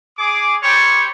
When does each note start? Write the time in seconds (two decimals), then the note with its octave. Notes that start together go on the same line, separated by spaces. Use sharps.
0.18 G#4 D6
0.62 G3 G4 C5 C#5